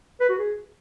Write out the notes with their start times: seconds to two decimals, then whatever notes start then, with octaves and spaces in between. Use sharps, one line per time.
0.20 B4
0.29 F#4
0.38 G#4